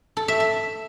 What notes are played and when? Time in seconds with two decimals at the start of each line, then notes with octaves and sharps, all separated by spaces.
0.17 A4
0.28 E5
0.40 E5